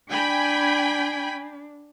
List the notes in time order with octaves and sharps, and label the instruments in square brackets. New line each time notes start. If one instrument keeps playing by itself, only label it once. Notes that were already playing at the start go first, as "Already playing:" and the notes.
[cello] D4 [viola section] G5 G#5 B5